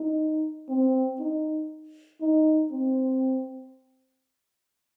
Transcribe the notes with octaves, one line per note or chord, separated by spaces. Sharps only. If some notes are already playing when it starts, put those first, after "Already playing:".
Already playing: D#4
C4
D#4
D#4
C4